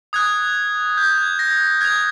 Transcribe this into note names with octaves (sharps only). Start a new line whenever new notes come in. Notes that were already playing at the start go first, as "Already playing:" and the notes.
D#6 F#6 G#6
G6
G#6
A#6
D#6 F#6 G#6